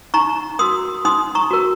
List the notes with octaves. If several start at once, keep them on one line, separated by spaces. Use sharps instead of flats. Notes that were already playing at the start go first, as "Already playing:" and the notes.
D#4 A#5 C#6
F#4 A#4 C6 D#6
D#4 C6 D#6
A#5 C#6
F#4 A#4